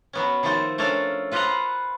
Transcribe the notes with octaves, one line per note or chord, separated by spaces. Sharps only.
F#3 B3 C#4
D#3 F3 A3 A4 C5
A3 C#4 D4 A4 A#4 F5
F4 B4 C5 D#5 F#5 A#5